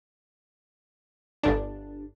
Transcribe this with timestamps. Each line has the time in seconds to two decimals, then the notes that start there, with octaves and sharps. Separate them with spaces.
1.43 G1 D4